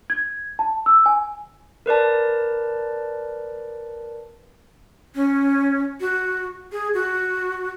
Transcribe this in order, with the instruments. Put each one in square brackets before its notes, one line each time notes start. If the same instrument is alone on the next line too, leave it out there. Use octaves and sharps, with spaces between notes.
[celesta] G#6
A5
E6
G#5
[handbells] A#4 B4 D5 A5
[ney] C#4
F#4
G#4
F#4